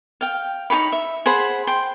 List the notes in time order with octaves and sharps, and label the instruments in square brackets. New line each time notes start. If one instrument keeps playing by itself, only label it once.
[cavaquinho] F5 G5
D#4 G#4 C#5 B5
E5
G#4 C5 F#5 B5
G5 C6